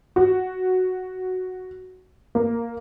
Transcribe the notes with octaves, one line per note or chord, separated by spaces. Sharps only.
F#4
A#3